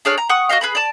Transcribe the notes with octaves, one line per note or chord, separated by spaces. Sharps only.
D4 G#4 C#5 F6
A#5
F#5 C#6 D#6
F#4 A4 D#5 F5
G#4 B4 B5
D5 A5